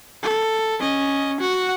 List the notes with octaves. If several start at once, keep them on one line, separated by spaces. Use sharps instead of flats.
A4
C#4 D#5
F#4 F#5